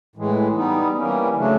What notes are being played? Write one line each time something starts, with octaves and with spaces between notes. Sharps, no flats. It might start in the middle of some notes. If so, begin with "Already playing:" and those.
A2 E3 G#3
G3 B3 D#4
E3 G3 A#3 C#4
C#3 F#3 A3 D4